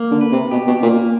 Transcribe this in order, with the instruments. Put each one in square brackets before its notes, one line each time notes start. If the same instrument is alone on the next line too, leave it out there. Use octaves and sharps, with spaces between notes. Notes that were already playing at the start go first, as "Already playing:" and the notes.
Already playing: [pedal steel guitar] A#3
[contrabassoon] D3
[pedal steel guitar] B4
[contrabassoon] C3
[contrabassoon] B2 [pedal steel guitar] G4
[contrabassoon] B2
[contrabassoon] A#2 [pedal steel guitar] A#3